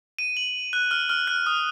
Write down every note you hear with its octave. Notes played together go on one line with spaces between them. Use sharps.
D#7
F#7
F#6
F6
F6
F#6
D#6